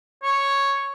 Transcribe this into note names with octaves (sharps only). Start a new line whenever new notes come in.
C#5